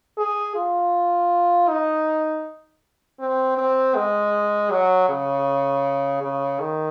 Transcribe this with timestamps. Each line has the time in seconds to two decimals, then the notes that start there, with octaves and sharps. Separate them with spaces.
0.17 G#4
0.55 F4
1.69 D#4
3.20 C4
3.58 C4
3.95 G#3
4.71 F#3
5.09 C#3
6.22 C#3
6.60 D#3